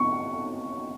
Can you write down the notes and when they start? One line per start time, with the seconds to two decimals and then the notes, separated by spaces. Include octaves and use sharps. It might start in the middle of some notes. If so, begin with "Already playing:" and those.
Already playing: C#6